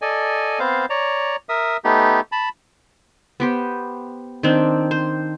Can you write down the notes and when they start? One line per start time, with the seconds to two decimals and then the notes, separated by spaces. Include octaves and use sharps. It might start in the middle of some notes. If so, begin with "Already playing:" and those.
0.02 A4 D5 D#5 G#5
0.59 B3 C4 C5 F5
0.90 C#5 D5 A#5
1.49 A#4 E5 D#6
1.85 A3 B3 D#4 G4
2.32 A5 B5
3.40 B3 G4 C5
4.43 D#3 C4 D4
4.91 C5